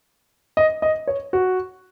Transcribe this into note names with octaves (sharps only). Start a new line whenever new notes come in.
D#5
D#5
C#5
F#4